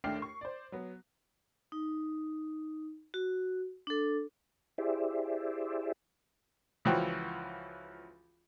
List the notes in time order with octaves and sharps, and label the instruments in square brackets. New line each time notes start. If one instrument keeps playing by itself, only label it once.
[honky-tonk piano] D#2 A3 D4 G5 F6 C7
C#6
C5 D5
F#3 B3
[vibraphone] D#4
F#4
D4 A4
[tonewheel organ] E4 G4 G#4 C5 D5 E5
[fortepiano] C#2 E3 F3 F#4 G5